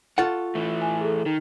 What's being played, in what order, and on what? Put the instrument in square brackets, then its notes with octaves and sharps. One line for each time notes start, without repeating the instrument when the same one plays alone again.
[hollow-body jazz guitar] F4 A4 F#5 [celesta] C#6
[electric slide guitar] E3 A3
[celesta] G#5
G#4 A4
[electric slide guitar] D#3 [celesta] D#4